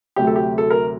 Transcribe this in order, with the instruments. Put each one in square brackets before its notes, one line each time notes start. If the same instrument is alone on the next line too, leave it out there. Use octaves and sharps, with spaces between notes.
[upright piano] D2 C3 F#3 A3 G4
A4
G4
A4
A#4